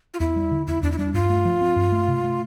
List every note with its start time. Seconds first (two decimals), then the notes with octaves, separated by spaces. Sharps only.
0.14 F4
0.20 E2 E4
0.36 G3
0.51 D3
0.67 E2 E4
0.83 E2 D4
0.92 E4
0.98 G3 D4
1.14 G2 F4
1.30 A3
1.45 F3
1.61 C4
1.76 G2
1.92 A3
2.08 C3
2.24 A3